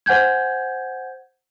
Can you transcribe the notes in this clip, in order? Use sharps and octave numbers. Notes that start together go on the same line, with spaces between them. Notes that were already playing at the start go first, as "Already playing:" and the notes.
C5 F#5 G#5 G6 G#6